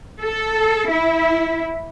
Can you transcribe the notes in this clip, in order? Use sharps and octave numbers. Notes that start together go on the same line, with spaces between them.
A4
E4